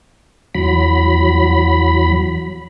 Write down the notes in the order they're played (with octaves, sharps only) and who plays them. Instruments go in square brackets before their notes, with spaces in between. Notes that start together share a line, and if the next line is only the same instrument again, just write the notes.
[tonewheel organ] E2 F#3 B5